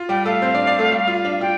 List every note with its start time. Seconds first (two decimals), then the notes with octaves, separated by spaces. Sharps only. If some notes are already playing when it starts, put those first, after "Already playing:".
Already playing: F4
0.09 G3 G4 G5
0.25 A3 A4 F5
0.42 C4 C5
0.54 D4 D5
0.66 D4 D5
0.79 A3 A4
0.91 G3 G4
1.08 F4
1.25 D4
1.41 F4 G5